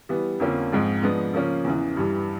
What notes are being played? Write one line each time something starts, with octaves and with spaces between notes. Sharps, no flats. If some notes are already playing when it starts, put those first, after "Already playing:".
E3 G3 B3
F2 D3 F3 A#3 C#4
G#2 F3 G#3 C4 F4
F3 G#3 B3 D4
C#3 F3 A#3 C#4
E2 C#3 E3
G2 E3 G3